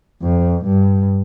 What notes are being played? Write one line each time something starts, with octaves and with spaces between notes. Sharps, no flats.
F2
G2